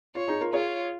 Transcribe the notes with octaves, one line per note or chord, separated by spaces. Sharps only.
F4 C#5
D#4 G#4
F4 A#4
F4 G#4 C#5